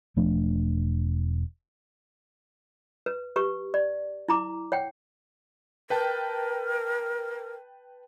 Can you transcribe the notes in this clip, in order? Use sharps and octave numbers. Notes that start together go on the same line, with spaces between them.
E1 F3 A3 D4
B4
G4 B4 C#6
D5
E4 A#5 D6
C#5 F#5 G5
A#4 B4 G5 A5